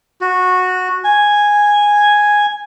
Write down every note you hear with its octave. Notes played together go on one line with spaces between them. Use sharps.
F#4
G#5